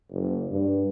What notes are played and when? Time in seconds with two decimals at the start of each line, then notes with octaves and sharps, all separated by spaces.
0.11 F#1
0.50 G2